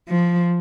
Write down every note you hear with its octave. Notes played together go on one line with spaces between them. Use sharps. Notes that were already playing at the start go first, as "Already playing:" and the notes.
F3